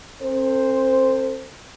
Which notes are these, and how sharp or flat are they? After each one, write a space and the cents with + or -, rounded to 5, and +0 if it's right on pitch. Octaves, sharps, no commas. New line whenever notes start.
C4 +35 A4 +40 C5 +0